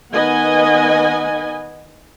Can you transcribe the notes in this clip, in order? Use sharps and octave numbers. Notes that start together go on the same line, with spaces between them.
D#3 B3 B4 D#5 F#5 G#5